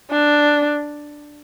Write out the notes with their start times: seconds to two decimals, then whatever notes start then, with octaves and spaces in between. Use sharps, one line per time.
0.11 D4